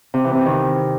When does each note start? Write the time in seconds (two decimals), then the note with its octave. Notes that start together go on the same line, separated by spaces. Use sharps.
0.14 C3
0.24 E3
0.35 C3
0.46 D#3